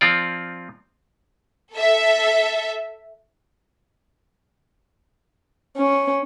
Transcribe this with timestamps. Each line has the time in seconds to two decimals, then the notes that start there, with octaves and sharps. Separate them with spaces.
0.01 F3 C4 F4 D5
1.73 A4 E5
5.77 C#4